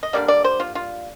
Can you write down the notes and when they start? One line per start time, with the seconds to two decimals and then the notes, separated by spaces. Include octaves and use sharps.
0.03 D#5
0.13 D3 G3 A#3 D5
0.28 D5
0.44 C5
0.60 F4
0.75 F4